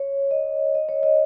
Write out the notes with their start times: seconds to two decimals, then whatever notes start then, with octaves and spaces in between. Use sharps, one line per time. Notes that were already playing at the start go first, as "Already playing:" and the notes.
Already playing: C#5
0.31 D#5
0.75 D#5
0.89 C#5
1.03 D#5